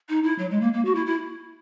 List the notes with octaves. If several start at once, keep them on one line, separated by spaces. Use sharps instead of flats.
D#4
E4
F#3
G#3
A#3
A#3
F#4
E4
E4